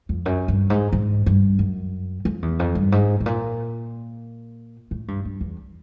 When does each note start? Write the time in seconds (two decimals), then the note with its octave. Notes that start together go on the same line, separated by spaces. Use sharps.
0.09 F2
0.26 F#2
0.48 G2
0.70 G#2
0.93 G#2
1.26 G2
1.59 F#2
2.25 F2
2.42 E2
2.59 F2
2.75 G2
2.92 G#2
3.20 A2
3.26 A#2
4.91 A2
5.08 G2
5.25 G2
5.41 E2